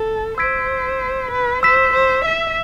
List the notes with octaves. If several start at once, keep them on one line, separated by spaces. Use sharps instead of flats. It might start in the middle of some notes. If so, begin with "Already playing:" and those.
Already playing: A4
C5 E6 G#6 B6 D7
B4
C5 E6 B6 E7
C5
E5